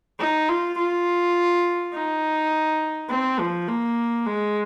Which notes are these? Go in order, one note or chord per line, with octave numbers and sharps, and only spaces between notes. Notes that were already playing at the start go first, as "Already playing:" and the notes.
D#4
F4
F4
D#4
C4
F3
A#3
G#3